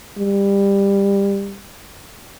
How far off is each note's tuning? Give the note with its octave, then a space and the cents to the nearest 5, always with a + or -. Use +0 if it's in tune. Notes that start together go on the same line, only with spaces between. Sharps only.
G3 +20